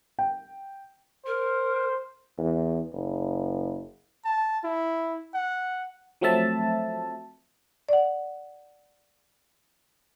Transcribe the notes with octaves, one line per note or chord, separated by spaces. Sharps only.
G5
A#4 C5
E2
F#1
A5
E4
F#5
F3 F#3 A3 C4 E5 A5
D5 F#5